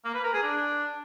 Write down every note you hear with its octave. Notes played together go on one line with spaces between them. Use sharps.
A#3
B4
A#4
G#4
D4